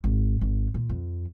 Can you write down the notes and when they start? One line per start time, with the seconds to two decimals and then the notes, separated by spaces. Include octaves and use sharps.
0.04 G#1
0.41 G#1
0.74 A#2
0.89 F2